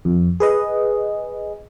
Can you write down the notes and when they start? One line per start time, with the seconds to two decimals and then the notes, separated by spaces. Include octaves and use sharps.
0.05 F2
0.40 G#4 B4 D#5